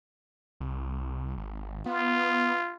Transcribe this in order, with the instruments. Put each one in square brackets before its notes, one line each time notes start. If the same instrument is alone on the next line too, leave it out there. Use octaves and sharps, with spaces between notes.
[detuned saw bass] C2
G#1
[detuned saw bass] B3 [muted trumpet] F4